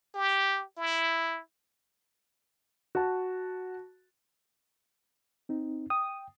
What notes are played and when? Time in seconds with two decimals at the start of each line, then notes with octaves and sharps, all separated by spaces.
0.15 G4
0.78 E4
2.95 F#4 A5
5.49 C4 D#4
5.90 G5 D#6